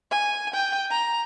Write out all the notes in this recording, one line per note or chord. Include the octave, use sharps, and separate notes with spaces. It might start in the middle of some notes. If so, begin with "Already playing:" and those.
G#5
G5
A#5